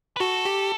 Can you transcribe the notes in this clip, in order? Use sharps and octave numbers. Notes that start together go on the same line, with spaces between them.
B4
F#4 A4
G4